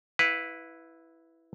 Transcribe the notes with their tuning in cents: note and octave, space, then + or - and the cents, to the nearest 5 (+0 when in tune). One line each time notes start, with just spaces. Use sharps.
E4 +0 B4 +0 F5 +40